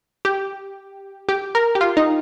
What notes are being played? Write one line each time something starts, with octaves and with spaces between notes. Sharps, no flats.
G4
G4
A#4
G4
F4
D#4